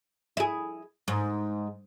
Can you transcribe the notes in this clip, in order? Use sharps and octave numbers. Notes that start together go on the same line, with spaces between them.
E4 G#4
G#2